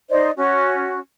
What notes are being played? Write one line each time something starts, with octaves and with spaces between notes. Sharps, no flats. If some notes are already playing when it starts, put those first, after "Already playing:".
D#4 C5 D5 D#5
C#4 F#4